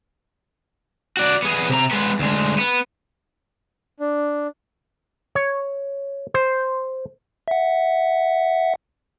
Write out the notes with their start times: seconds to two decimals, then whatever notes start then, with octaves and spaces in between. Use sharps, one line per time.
1.17 F#4 D5
1.42 B3 G#4
1.69 C3 A#5
1.91 G#3 B3
2.19 D2 G#3
2.58 B3
4.00 D4
5.35 C#5
6.34 C5
7.48 E5 F#5